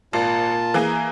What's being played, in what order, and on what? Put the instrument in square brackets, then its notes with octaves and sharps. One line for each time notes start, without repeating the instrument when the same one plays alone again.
[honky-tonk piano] G#1 [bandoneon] A#2 F4 A5
[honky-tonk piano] E3 A#3 G#4